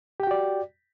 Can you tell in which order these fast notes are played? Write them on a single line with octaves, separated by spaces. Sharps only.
G4 G5 F#4 D5